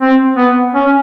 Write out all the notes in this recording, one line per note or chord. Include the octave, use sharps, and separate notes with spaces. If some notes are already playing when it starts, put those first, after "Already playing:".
C4
B3
C#4